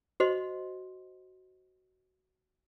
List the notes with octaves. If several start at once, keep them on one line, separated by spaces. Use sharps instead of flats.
F#4 C5 D#5 C6